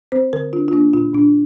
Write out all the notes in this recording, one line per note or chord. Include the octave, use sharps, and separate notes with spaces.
C4 C5
D3 A#4
D4 F4
F4
A#3 D4
A#2 F4
A#2 D4